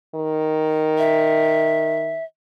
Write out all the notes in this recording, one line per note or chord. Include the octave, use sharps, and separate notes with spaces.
D#3
E5